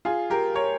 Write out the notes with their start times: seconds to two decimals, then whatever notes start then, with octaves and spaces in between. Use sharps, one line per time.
0.05 F4 G#4
0.30 G4 A#4
0.55 A#4 C#5